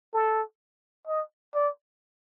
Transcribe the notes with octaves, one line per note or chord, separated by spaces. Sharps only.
A4
D#5
D5